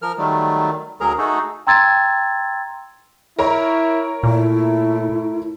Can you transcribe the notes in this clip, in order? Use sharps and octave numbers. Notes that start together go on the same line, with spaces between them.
F3 A#4 F6
D#3 F#3 G3 A3
D2 F#3 G#4 A#4 A#5
A3 D#4 F#4 G#4 A4
G5 A#5 C6 E6 G#6 A6
E4 A#4 C#5 A#5
A#2 A3 E4